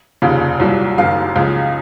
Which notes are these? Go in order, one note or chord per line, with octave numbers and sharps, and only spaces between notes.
F1 D#2 C#3 F3
C2 A#2 F#3
F#1 F#2 D#3 F5
C#2 C#3 F3